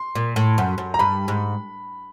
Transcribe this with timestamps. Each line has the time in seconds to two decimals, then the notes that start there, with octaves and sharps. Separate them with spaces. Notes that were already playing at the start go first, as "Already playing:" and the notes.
Already playing: C6
0.15 A#2
0.36 A2
0.58 F#2
0.78 F#2
0.94 A#5
0.99 G2 B5
1.28 G#2